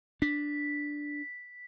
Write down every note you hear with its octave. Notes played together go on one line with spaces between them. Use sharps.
D4 B6